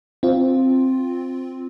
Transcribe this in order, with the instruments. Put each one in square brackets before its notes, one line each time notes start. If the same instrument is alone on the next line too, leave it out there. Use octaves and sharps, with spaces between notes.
[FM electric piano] C4 F4